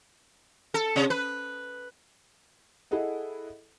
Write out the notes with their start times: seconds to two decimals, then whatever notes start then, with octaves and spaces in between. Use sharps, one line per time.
0.74 A4
0.96 C3
1.10 B4
2.91 E4 G#4 A4 D#5 F#5